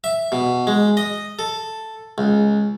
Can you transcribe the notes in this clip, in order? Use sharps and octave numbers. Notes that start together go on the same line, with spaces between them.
E5
B2
G#3
D#5
A4
C#2